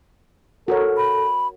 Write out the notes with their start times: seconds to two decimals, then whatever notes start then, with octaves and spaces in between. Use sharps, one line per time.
0.68 F#4 A4 A#4 C#5
0.97 B5